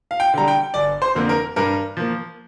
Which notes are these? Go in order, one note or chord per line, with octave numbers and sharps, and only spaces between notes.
F5
G5
D3 G3 A#5
G5
G1 D5
C5
F2 D3 A#3
A#4
G2 A#4
F3 A#3